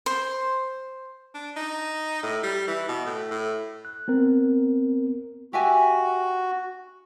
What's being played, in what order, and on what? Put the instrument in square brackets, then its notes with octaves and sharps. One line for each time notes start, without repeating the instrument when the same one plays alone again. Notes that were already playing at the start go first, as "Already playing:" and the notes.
[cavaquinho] C5
[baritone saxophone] D4
D#4
A2
G3
E3
B2
A2
A2
[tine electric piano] F#6
B3 C4 A#4
[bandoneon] F#4 [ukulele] G4 E5 G#5